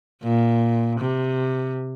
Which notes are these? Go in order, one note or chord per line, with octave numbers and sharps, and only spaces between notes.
A#2
C3